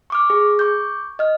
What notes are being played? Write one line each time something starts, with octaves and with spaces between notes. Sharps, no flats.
C#6 D6 F6
G#4
C#6 D6 G6
D#5 F6